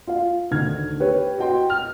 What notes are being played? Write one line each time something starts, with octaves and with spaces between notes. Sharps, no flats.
F4 F5
D2 D#3 F6 G#6
G4 B4 C#5
F#4 D#5 G5 C6
F6